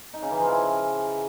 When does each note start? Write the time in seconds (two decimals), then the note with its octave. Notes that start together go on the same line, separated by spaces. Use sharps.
0.14 D#4
0.22 C#3
0.31 E3
0.40 F3
0.48 E4